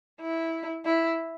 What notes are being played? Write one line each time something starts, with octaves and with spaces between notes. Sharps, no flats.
E4
E4